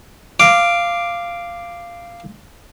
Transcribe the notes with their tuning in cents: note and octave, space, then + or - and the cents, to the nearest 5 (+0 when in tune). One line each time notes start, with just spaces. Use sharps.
F5 -10 D6 +5